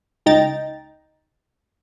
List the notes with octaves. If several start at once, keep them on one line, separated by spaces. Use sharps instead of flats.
C#2 D#4 G5 A#5 A6